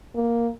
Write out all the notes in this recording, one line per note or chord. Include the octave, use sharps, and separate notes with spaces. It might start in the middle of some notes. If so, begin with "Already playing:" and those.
A#3